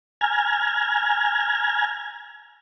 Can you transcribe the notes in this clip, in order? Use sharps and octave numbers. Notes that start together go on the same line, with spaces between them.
G#5 A#5 F6 G#6